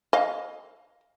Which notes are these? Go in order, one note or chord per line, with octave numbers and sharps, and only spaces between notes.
D#5 F5